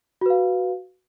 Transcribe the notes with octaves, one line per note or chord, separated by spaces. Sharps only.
F#4 B4 F5